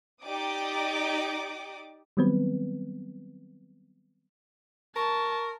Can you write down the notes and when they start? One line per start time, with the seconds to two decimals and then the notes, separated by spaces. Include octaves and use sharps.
0.22 D#4 G4 D5 D6 D#6
2.17 D#3 F#3 G3 B3 C4 B4
4.96 A#4 A5 C#6